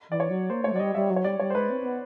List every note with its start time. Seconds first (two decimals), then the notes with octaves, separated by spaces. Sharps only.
0.09 E3 D5
0.20 C#5
0.29 F#3
0.50 A#3 C5
0.64 A3 C#5
0.72 F#3
0.76 D5
0.79 G3 D#5
0.95 G3 E5
1.10 F#3
1.16 C#5
1.24 G3 D5
1.39 G3 C#5
1.50 C5
1.54 G#3 B4
1.70 C4
1.80 C4
1.85 B3